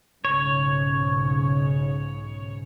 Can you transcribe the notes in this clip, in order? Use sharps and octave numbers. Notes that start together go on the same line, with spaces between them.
B1 G#2 C#3 C#5